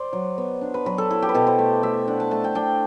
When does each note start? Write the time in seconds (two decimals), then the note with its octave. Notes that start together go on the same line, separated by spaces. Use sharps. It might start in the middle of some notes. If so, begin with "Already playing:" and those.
Already playing: C5 D5
0.13 F#3
0.38 B3
0.61 D4
0.74 B4
0.86 F#3 B4
0.98 A4
1.11 E4 A4
1.22 G4
1.29 B4
1.35 B2 A4
1.47 C5
1.59 A3
1.83 A3 E5
2.08 D4 F#5
2.20 A5
2.31 A3 A5
2.44 G5
2.55 D4 G5